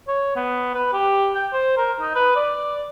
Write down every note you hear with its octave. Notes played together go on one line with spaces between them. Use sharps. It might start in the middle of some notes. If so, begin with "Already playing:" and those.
C#5
B3
B4
G4
G5
C5
A#4
D#4
B4
D5